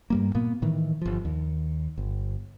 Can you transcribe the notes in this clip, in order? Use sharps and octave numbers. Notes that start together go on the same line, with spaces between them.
G2 G3 A#3
A#2 A#3 B3
A2 D#3 E3
G1 F3
D#2
G1